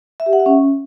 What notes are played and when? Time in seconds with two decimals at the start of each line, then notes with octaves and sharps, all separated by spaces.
0.20 E5
0.26 G4
0.33 F#5
0.39 E5
0.46 C#4